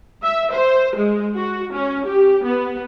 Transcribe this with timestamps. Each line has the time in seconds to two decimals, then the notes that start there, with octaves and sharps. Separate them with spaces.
0.23 E5
0.52 C5
0.96 G#3
1.34 F#4
1.73 C#4
2.06 G4
2.44 B3